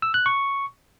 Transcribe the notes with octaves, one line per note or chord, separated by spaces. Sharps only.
E6
F#6
C#6